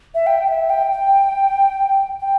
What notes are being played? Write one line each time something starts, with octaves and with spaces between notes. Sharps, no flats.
E5
G5
E5
G5
G5
G5